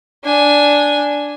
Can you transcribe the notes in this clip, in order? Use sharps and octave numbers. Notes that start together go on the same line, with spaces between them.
D4 G#5